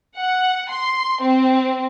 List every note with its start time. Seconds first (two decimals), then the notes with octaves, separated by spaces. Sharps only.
0.16 F#5
0.70 C6
1.22 C4